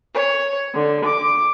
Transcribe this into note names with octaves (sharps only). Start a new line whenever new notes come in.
C#5
D3
D6